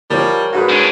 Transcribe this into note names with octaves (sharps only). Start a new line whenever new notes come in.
F3 G3 A#4 C#5
G#2 F#4 G#4 B4
C#4 D4